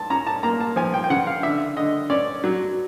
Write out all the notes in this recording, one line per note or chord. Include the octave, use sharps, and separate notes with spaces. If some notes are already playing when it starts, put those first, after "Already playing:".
Already playing: A5
C#4 A#5
A5
A#3 A#5
A5
F3 G#5
G5
G5
C#3 F#5
F5
D3 E5
D3 D#5
C#4 D5
F#3